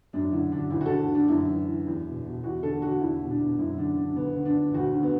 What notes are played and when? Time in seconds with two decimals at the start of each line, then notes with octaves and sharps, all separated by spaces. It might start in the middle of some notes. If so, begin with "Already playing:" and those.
0.13 F#2 D4
0.32 D3 E4
0.52 D3 D4
0.70 D2 E4
0.81 F#4
0.86 D3 A4
1.09 D3
1.14 D4
1.28 F#2 E4
1.48 E3
1.67 E3
1.87 E2
2.05 B2
2.24 B2
2.44 E2 F#4
2.63 D3 A4
2.82 D3 F#4
3.01 E2 E4
3.20 B2
3.30 D4
3.40 B2
3.58 F#2 E4
3.78 D3 D4
3.97 D3 D4
4.16 D2 B3
4.36 D3
4.45 D4
4.55 D3
4.74 D2 F#4
4.93 D3
5.03 B3